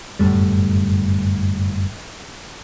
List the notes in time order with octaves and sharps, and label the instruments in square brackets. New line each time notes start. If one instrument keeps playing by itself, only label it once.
[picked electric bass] G1 F#2 A2 G3